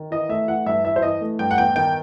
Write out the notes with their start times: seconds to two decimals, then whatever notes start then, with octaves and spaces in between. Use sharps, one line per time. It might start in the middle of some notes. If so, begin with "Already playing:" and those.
Already playing: D#3
0.11 E3 D#5
0.29 A3 E5
0.48 E3 F#5
0.66 G2 E5
0.85 E3 E5
0.96 C5
1.02 E3 D#5
1.21 A3
1.39 G2 G5
1.51 F#5
1.58 E2 G5
1.76 D#3 G5